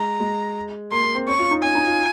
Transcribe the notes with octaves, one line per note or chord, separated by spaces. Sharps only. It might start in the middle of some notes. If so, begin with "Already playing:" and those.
Already playing: G#3 A#5
G#3
A#3 C6
A#3
C4
C#4 C#6
F4
D#4
C#4 G#5
D#4
F4